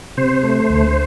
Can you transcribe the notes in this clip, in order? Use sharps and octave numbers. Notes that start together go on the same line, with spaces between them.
C3 C5
A3
D2